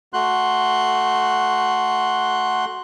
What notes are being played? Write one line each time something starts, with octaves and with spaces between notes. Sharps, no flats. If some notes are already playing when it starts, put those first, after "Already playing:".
A3 F#4 C6 F#6